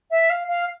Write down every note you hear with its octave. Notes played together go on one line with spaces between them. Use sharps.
E5
F5
F5